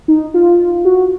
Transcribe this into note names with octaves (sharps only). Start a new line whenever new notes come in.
D#4
F4
F#4